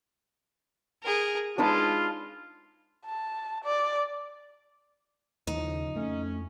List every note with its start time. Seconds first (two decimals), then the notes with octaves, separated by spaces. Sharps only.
1.03 G#4 A#4
1.58 G#3 D4 D#4 F4 B4
3.05 A5
3.65 D5
5.47 D#2 C#3 F3 D#4
5.96 F2 A3 C#4